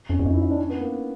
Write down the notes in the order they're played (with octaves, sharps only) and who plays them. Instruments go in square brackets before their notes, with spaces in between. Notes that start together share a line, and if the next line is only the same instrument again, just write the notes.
[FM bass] F2 [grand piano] C#4
[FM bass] E2
[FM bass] F2 [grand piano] D#4
[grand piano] E4
D#4
D4
C#4
B3
A#3